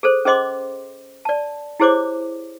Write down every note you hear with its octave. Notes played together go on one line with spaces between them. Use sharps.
G#4 A4 C5
C#4 G#4 C5 D#5 C6 D6
D5 A5
E4 G4 G#4 C5 C#5 D6